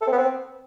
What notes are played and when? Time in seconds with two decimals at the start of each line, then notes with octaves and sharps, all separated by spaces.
0.01 A4
0.07 C4
0.12 B3
0.18 C4